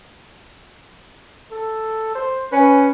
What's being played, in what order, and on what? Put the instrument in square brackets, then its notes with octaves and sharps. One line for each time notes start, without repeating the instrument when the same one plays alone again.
[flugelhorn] A4
C5
[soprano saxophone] C#4 [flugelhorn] B4